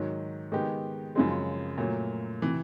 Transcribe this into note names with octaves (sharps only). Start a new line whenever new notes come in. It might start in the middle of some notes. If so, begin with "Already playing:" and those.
Already playing: G#2 D#3 F#3
D#3 G#3 B3 D#4 G4
F#2 C#3 F3 G#3 C4
A#2 F#3 A3
C3 E3